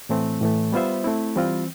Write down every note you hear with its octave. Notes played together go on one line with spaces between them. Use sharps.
A2 E3 A3 C4
A2 E3 A3
G3 B3 F4 C5 E5
A3 C4 E4
E3 G3 C4 F4